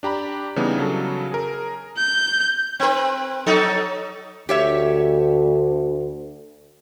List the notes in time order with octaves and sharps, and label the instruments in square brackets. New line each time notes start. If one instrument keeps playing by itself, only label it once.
[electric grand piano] D4 G4 A#5 B5
C#3 E3 G3 B3 D4 D#4
C#3 F#3 A4
G#4 A#4
[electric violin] G6
[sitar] C4 B4
F#3 D#4 A4
[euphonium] D2 [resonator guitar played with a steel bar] G4 C#5 E5